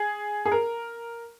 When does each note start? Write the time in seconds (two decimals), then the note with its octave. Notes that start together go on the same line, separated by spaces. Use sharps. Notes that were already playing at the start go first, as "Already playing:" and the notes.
Already playing: G#4
0.45 G#4
0.52 A#4